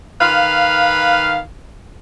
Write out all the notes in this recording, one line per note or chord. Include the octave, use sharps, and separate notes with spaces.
D#3 B4 F5